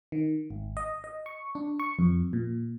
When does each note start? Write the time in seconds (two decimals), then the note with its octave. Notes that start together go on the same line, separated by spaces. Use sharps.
0.12 D#3
0.50 G#1
0.77 D#5
1.04 D#5
1.26 C#6
1.55 D4
1.80 C#6
1.99 F2
2.33 A#2